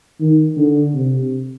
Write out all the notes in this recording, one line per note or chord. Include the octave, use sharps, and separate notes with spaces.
D#3
D3
C3